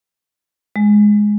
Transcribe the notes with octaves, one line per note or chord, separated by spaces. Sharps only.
G#3